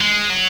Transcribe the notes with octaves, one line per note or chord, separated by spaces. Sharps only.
G#3
F#3